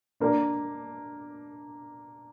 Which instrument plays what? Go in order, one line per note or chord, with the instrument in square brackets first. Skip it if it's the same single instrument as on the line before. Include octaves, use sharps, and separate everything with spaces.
[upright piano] A#3 D4